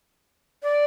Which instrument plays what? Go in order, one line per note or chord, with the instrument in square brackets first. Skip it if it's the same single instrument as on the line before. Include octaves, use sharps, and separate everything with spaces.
[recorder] D5